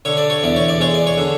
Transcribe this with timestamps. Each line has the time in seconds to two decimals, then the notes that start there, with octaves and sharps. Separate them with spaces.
0.05 D3 C#5
0.17 D5
0.30 C#5
0.43 E2 D5
0.56 C#5
0.68 D5
0.80 G#3 C#5
0.94 D5
1.07 C#5
1.18 D3